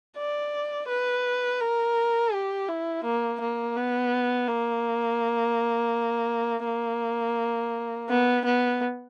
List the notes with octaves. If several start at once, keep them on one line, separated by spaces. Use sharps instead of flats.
D5
B4
A#4
G4
E4
A#3
A#3
B3
A#3
A#3
B3
B3